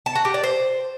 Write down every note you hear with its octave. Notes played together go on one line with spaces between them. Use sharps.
A5
F#4
G4
D5
C5